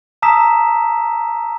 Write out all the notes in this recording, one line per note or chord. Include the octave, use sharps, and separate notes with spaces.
A5 A#5 D#6 E6 B6 E7